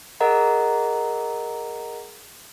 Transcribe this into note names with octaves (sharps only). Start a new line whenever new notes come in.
G#4 A#4 D#5 F#5 A#5